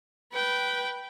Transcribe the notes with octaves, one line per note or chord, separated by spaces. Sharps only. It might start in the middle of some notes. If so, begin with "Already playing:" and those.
B4 G5